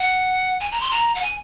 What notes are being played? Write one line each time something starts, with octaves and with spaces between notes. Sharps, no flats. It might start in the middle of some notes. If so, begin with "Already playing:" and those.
Already playing: F#5
G#5
A#5
C6
A#5
F#5
G#5